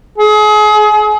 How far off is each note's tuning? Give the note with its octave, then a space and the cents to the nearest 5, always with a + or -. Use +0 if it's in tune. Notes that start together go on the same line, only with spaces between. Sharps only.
G#4 +35